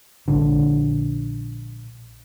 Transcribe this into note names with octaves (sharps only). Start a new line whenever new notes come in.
A#1 D3